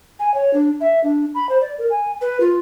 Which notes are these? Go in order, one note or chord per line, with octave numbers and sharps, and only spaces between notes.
G#5
C#5
D4
E5
D4
B5
C5
D5
A#4
G#5
B4
F4